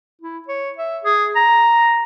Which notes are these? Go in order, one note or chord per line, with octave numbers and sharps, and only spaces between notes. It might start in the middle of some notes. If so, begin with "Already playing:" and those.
E4
C#5
E5
G#4
A#5